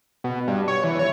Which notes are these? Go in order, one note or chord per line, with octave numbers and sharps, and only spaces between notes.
B2
G2
C#5
E3
C#5